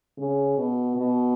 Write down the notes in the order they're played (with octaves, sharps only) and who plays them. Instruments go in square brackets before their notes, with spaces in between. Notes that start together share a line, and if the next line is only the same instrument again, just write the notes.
[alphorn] C#3
B2
B2